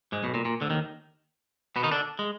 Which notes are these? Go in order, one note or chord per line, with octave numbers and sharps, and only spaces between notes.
G#2 G#3
B1 B2
A#2
A#2
D2 D3
D#2 D#3
B2 B3
D#3 D#4
D3 D4
G#3